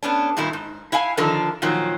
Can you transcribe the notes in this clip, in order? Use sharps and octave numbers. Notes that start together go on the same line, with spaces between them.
A3 B3 C#4 D4
G2 A#2 D#3 A3 E4
G#2
E4 E5 F5 G#5
D3 D#3 F3 D4 A4 A#4
A#2 D#3 F3 F#3